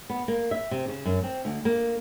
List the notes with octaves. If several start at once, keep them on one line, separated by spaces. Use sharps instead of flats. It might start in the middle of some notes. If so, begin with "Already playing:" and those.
B3
A#3
E5
C3
C#3
F#2
C4
D2
A#3